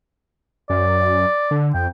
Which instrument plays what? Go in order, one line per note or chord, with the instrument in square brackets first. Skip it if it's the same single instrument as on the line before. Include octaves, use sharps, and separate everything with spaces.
[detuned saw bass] F#2 [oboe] D5
[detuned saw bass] D3
[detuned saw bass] F2 [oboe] G5